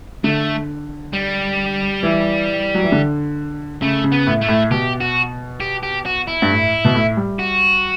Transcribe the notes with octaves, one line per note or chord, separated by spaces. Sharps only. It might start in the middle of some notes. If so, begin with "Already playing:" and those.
D3 A3
G3
E3
F#3
E3
D3
C#3 A3
C#3
B3
A2
A3
A2
B2 G4
F#4
G4
G4
F#4
E4
G2
A2
B2
A2
G3
F#4